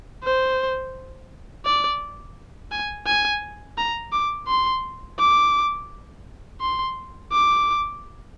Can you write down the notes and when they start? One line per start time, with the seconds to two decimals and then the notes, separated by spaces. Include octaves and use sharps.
0.24 C5
1.66 D5
2.72 G#5
3.06 G#5
3.78 A#5
4.12 D6
4.48 C6
5.19 D6
6.61 C6
7.32 D6